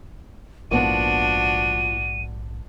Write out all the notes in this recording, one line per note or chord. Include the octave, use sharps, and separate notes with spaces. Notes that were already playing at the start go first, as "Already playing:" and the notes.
A#1 G#2 F3 A#3 B3 D4 F#4 D#7